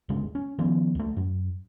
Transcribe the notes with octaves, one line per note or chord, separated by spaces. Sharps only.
G1 D2 C#3 G#3
C#4
D#3 F3 B3 C#4
C#2 A3
F#2